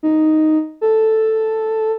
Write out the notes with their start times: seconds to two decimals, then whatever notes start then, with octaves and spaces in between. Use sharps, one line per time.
0.03 D#4
0.81 A4